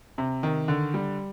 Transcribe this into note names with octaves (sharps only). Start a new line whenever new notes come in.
C3
D#3
D3
G3